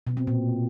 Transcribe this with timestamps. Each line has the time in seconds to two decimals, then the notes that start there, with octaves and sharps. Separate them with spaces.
0.07 B2
0.17 C4
0.27 A#2